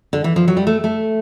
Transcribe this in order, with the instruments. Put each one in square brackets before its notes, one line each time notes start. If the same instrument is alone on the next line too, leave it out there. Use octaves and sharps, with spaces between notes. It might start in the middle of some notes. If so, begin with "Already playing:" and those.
[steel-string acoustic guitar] D3
E3
F3
F#3
G3
A3
A3